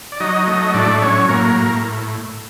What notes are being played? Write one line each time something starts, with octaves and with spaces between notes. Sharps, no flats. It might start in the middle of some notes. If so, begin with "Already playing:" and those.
D5
F#3 D#4 D#5
A3 D#4 D#5
A2 D4 D5
F#3 C#4 C#5
A2 A#3 A#4
A2